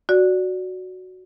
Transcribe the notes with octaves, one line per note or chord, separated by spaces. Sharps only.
F#4 D5